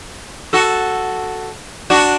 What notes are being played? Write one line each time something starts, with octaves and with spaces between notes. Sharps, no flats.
F#4 A4
D4 F#4